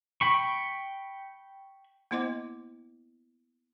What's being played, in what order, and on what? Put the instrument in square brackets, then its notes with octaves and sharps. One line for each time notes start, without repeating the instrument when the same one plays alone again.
[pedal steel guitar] G5 B5 C#6
[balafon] A#3 B3 E4 C5 D#5 D6